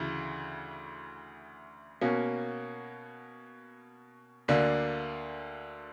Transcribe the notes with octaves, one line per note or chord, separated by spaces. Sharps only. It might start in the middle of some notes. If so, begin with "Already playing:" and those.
Already playing: D2 C#3 E3
B2 A#3 C#4 F#4
D2 D3 A#3 D4